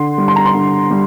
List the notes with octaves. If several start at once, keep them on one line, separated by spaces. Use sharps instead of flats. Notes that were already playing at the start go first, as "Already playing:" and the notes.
Already playing: D3 C6
G3
C6
A#5
C6
D3
G3